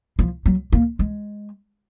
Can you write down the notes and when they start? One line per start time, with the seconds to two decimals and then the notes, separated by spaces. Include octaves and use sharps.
0.19 F3
0.46 F#3
0.73 A#3
0.99 G#3